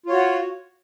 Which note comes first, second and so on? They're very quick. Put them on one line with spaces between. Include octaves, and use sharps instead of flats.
F4 C#5 F#4